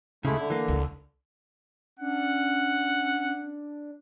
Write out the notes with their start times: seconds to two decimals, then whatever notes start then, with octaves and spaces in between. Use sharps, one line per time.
0.25 D2 C#3 G#3 A3 E4
0.37 D3 E4
0.50 E3 A#3
0.68 C#2
2.00 C#4 D4 F#5